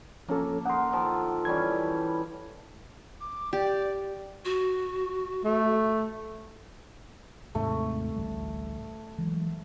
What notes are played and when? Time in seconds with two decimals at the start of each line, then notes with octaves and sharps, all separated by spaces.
0.28 F3 A#3 C#4 A4
0.65 D#4 A#4 F#5 C6
0.92 D#3 F3 A4
1.45 E3 G3 C#4 G#6
3.20 D6
3.53 G4 D5
4.45 F#4
5.45 A3
7.55 D#2 G#2 C3 A3
8.16 A1 D2 G3
9.18 E3 F#3 G#3